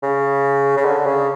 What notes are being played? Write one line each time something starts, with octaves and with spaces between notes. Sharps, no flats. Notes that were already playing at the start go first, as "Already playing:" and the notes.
C#3
C#3
D3
C#3